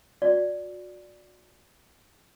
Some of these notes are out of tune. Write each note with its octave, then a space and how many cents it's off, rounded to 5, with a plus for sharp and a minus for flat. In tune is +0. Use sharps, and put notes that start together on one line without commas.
F#4 -35 D5 +0